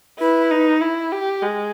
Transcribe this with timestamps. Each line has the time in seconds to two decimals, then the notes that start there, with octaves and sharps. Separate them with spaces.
0.19 E4 B4
0.51 D#4
0.81 E4
1.12 G4
1.42 G#3